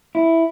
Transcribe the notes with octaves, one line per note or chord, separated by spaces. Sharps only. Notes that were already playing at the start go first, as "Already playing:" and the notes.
E4